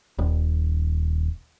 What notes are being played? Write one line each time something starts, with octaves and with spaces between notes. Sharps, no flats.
D#1